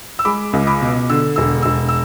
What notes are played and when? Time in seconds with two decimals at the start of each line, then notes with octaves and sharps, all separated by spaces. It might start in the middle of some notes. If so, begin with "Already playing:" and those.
0.19 E6
0.25 G#3 B5 D6
0.53 C#2
0.67 B5 D6
0.82 B2
1.09 D3 E6
1.36 E1 E6
1.62 E1 E6
1.89 E6